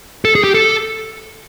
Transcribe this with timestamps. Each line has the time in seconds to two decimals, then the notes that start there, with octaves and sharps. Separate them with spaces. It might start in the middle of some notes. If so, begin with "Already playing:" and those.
0.25 A4
0.35 G#4
0.44 G4
0.55 A4